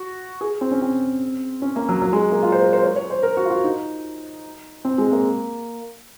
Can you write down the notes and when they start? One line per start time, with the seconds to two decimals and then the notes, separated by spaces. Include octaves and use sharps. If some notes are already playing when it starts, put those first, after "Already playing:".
Already playing: F#4
0.41 G#4
0.61 C4
0.71 C#4
0.82 C4
1.62 C#4
1.76 A#3
1.89 F#3
2.02 F#3
2.13 G#3
2.32 A#3
2.42 F4
2.52 C5
2.62 A#4
2.73 C5
2.83 C#5
2.96 C#5
3.10 C5
3.23 A#4
3.37 F#4
3.45 F4
3.50 F#4
3.64 D#4
4.85 C4
4.98 G#3
5.12 A#3